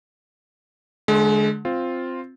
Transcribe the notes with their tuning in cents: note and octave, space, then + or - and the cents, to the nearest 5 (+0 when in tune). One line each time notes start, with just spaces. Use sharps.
D3 +0 G#3 +30
C4 +0 F4 +0